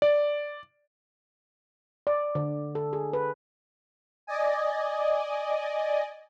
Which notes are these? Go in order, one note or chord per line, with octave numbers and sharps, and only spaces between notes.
D5
D5
D3
A4
G#4
B4
D5 D#5 G#5